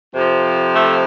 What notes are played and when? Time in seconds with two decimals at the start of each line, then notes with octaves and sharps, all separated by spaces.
0.14 F2 C3 F3
0.74 A3